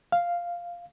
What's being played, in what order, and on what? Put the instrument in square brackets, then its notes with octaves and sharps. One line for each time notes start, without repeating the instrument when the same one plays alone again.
[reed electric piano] F5